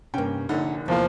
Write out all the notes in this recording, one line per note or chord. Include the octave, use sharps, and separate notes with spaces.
G2 C3 A#3 C#4 G5
A#1 A#2 D3 D#4 C#5 F#5
E2 C3 F3 A#3